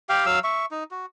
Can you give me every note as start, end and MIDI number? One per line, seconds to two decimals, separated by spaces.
0.09 0.26 67
0.09 0.26 77
0.09 0.26 79
0.26 0.39 54
0.26 0.39 77
0.26 0.39 88
0.44 0.66 76
0.44 0.66 85
0.71 0.84 63
0.91 1.06 66